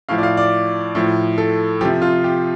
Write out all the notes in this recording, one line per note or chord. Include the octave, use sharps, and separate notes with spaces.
A2 F3 F5
D5
F5
D5
A2 F3
A4
C3 F3 G4
F4
G4